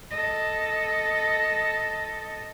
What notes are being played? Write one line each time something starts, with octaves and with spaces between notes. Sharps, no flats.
A4 D#5